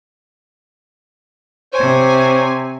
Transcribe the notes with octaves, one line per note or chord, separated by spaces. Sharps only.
C3 C5 C#5 G#5